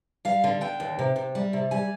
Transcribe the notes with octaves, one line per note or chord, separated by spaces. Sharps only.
G3 F5
D3
D3 G5
D#2
C3
C3
G3
C3
G3 G#5